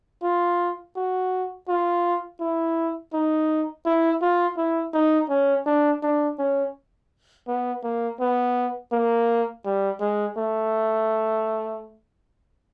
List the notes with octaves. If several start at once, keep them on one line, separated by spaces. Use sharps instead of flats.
F4
F#4
F4
E4
D#4
E4
F4
E4
D#4
C#4
D4
D4
C#4
B3
A#3
B3
A#3
G3
G#3
A3